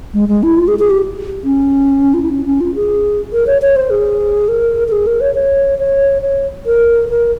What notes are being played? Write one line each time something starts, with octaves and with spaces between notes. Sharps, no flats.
G#3
G#3
E4
F4
G#4
G#4
G4
C#4
F4
E4
C#4
C#4
F4
G#4
A#4
C#5
C#5
C5
G#4
A#4
A#4
G#4
A#4
C#5
C#5
C#5
C#5
A#4
A#4